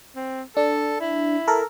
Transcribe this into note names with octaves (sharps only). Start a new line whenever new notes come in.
C4
D4 A4
E4
A4 A#4